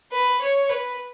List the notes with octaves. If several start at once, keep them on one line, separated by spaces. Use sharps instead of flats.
B4
C#5
B4